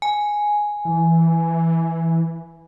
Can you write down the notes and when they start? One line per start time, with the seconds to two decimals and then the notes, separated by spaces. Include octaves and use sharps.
0.02 G#5
0.85 E3